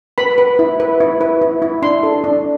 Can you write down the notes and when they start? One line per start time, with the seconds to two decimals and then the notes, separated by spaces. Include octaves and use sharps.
0.18 B4 B5
0.38 B4
0.59 E4
0.80 B4
1.00 E4
1.21 B4
1.42 E4
1.62 E4
1.82 D4 C6
2.03 A4
2.24 D4